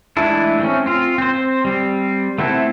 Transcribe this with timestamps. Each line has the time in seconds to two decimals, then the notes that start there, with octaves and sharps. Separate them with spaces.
0.17 E3 G#3 A3 D4 E4
0.60 A3 C4 C#4
0.86 C4 F4
1.18 C4 C5
1.65 G3 C4
2.38 A3 B3 C4 E4 A4